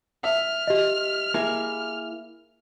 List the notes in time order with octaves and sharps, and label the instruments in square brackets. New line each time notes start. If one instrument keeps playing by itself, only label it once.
[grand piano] E5 [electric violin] F6
[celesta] G4 D#5
[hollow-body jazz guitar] A#3 E4 G#4